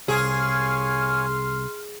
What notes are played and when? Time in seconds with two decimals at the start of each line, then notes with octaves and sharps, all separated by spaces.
0.08 C2 G#4 C#5 F5 G#5 C6 F6